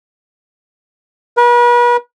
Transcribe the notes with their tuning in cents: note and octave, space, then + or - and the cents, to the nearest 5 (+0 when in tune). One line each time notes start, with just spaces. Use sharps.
B4 -40